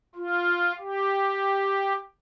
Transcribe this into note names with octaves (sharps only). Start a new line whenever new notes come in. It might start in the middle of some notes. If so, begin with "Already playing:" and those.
F4
G4